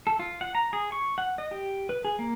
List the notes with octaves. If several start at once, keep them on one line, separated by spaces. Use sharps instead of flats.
A4
F4
F#5
A#5
G#4
C#6
F#5
D#5
G4
B4
G#4
A#3